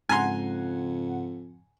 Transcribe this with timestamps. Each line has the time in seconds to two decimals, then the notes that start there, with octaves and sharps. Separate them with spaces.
0.09 F2 G#2 C#3 F#5 G#5 A#5 C6